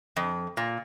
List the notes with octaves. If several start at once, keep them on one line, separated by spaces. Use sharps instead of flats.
F2
A#2